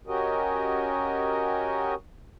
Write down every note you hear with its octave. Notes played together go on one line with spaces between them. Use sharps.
C#4 F#4 G4 A#4 D#5